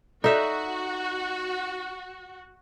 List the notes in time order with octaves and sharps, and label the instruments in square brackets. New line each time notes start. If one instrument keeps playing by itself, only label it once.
[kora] D#4 E5 [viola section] F#4 [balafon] A4 D5